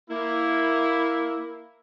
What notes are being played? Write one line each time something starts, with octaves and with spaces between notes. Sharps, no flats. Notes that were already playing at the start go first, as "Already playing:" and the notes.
A#3 E4